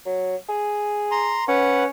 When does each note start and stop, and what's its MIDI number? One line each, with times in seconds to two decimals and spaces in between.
0.06 0.36 54
0.49 1.39 68
1.11 1.44 82
1.11 1.44 84
1.48 1.90 61
1.48 1.84 71
1.48 1.84 78